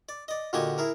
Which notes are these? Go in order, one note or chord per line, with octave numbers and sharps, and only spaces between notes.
D5
D5 D#5
A#2 D3 F#4 G4 D#5 G#5
E4 G#4 A#4